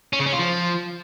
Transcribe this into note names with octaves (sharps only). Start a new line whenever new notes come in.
C#4
C#3
C#4
F4
F3